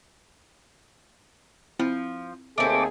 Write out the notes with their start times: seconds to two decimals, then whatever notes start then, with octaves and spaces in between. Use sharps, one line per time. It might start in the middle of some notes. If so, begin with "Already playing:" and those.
1.79 F3 C4 E4
2.58 D#2 A3 C4 G#4 D6